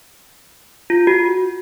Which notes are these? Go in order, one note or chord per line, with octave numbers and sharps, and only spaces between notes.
F4
F#4